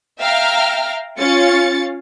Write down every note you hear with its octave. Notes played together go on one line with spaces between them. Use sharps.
E5 F5 G5 A#5 F6
C#4 F4 F5 A6 C#7